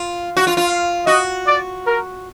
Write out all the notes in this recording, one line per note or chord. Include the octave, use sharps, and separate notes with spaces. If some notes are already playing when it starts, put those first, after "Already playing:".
Already playing: F4
F#4
F4
F4
F5
F#4 D#5
D5
A#4